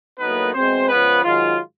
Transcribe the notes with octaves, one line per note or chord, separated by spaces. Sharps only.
A2 F#3 A#3 B3 D#4 B4
E2 B2 G#3 C4 C5
C#2 C#3 F3 B3 B4
G#2 D#3 F#3 F4